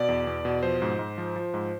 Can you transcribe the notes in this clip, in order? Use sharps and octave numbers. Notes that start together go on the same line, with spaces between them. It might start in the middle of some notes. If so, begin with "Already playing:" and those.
Already playing: B2 D5
E2
E2
B2
F3 C5
G#2
G#2
F3
F3
G#2